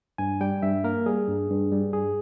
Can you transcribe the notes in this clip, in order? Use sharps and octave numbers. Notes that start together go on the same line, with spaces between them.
G2 G#5
G3 G5
G2 E5
A#3 A#4
G3 G#4
G2
G2
G3
G2 G#4